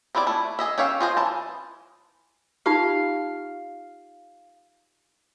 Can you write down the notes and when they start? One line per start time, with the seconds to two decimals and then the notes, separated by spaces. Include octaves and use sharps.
0.15 B3 C4 E4 A#4 D5
0.27 A3 E4
0.59 G#4 D#5 E5
0.78 C#4 G4 C#5 E5 F5
1.00 F4 G#4 C5 D#5
1.17 E3 A5
2.66 D#4 F4 G4 F5